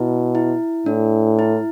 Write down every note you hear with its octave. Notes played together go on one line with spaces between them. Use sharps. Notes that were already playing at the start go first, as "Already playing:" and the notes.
Already playing: B2 E4
E4
A2 D4
E4